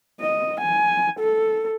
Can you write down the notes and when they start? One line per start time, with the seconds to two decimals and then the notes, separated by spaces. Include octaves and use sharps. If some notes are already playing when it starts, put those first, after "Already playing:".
0.21 D#5
0.60 G#5
1.20 A4